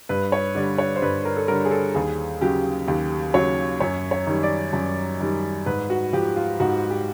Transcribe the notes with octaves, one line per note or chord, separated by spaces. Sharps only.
G2 B4
C#5
D3 G3 D5
C#5
C5
G2 B4
A#4
A4
D3 G3 A#4
G#4
A4
D#2 G#4
C#3 F#3 G4
D#2 G4
C#3 F#3 C#5
F#2 C#5
C#5
D#3 G3
D5
F#2
D#3 G3
G#2 B4
F#4
F3 G4
F4
G#2 F#4
G4